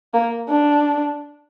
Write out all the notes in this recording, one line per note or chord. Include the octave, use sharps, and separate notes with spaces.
A#3
D4